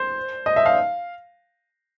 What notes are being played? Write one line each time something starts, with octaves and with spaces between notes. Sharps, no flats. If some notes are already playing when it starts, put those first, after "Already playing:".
Already playing: C5
D#5
E5
F5